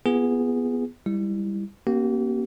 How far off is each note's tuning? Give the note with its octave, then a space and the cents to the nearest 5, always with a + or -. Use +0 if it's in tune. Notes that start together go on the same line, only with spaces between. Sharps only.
B3 -5 F4 -35 G#4 -10
G3 +20 E4 +0
A#3 +25 C#4 -25 G4 -35